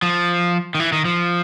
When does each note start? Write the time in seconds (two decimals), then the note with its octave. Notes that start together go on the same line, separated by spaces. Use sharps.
0.02 F3
0.75 D#3
0.80 E3
0.92 D#3
1.05 F3